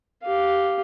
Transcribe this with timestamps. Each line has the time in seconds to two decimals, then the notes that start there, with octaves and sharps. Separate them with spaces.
0.23 G4 F5